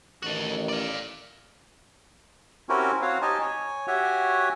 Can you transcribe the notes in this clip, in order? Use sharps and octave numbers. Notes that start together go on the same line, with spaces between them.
A1 D#3 F#4 A4
D5 F5
C4 C#4 E4 F#4 G4 A#4
C4 F#4 C#5 F5 F#5
D#4 G4 D#5 G#5 A5
C#5 G#5
F#4 G4 C#5 E5 F#5 G#5